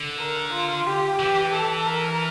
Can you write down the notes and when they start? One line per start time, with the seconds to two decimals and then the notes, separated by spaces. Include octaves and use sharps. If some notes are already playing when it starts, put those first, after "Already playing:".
Already playing: D3
0.18 A#4
0.53 F4
0.86 G4
1.19 E3 G4
1.53 A4
1.86 A#4